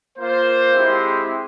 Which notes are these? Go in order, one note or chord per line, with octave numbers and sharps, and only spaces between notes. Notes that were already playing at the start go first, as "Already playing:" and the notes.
A#3 F4 C5
G#3 C4 E4 G4